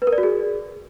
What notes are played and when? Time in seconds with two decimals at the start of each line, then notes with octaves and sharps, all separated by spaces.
0.02 B4
0.07 A#4
0.12 D5
0.18 F#4
0.23 G#4